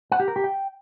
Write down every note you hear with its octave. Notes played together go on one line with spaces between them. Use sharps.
F#5
G4
A#4
G4
G5